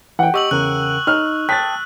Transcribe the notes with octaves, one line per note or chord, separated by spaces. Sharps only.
E3 F#5 G5
G4 D#5 C#6 E6 F#7
E2 C#3 A#4 F#6
D#4 F6
G5 A5 D#6 F#6 A6 B6